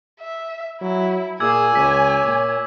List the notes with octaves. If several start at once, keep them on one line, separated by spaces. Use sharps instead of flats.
E5
F#3 E4
A#2 G#4 G#5 D6 E6 G#6
C#2 C#5 B6
A#2